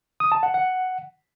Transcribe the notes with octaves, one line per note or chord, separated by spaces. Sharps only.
D#6
A5
F#5
F#5